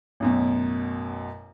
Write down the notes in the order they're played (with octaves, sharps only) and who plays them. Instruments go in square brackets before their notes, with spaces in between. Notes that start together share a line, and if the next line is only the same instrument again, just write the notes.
[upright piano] A1 F#2 B2